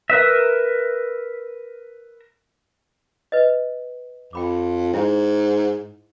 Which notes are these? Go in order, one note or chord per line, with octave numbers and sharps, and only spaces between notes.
A#4 B4 E5
B4 D#5
F2 G5 B5 D6
G#2 E4